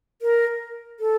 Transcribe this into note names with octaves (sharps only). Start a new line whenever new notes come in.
A#4
A4